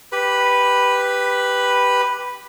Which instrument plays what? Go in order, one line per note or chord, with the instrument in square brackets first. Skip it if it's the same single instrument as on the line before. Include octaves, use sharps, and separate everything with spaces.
[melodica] G4 B4 B5